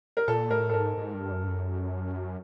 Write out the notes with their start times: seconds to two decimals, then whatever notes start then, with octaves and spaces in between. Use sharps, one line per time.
0.17 A#4
0.28 A#2 A4
0.50 A2 A#4
0.69 A4
0.73 G#2 A#4
0.97 G#2
1.14 G2
1.32 F#2
1.43 G2
1.48 F#2